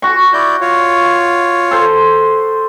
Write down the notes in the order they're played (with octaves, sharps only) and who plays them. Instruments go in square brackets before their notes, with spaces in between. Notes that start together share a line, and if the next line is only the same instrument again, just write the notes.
[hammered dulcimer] F#4 C#6
[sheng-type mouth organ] E4 D5 G6
F4 C#5
[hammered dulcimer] A4 C5